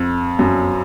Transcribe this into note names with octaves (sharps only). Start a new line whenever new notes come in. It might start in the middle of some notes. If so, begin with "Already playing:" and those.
Already playing: F2
F#2